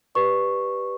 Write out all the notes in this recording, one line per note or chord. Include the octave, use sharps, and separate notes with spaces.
G4 B4 D5 C#6